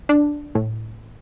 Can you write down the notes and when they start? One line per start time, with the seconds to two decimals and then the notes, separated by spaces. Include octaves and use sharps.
0.09 D4
0.55 A2